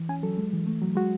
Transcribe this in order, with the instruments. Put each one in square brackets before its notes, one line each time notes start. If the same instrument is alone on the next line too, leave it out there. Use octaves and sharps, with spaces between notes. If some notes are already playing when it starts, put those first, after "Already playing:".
Already playing: [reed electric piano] E3
C#4 G#5
F#3 A4
G#3
E3
A3
F#3
G#3 F#4